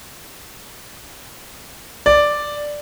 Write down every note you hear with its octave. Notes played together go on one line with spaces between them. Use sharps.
D5